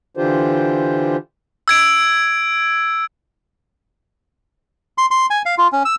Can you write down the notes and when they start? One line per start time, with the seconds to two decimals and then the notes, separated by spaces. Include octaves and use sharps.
0.17 D3 E3 D4 F4 G4 C5
1.68 E6 G#6 D7
4.98 C6
5.11 C6
5.30 G#5
5.46 F5
5.58 F4
5.72 C#4
5.85 E6